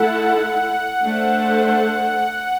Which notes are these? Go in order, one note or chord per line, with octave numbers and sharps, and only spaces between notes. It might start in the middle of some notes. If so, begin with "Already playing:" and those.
Already playing: A3 E4 A4 F#5
A3 D4 A4 C5